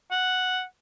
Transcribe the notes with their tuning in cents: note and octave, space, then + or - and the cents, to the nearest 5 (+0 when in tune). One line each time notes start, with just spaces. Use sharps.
F#5 -5